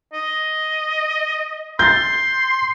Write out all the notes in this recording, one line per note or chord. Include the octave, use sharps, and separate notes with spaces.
D#5
C6 G6 A6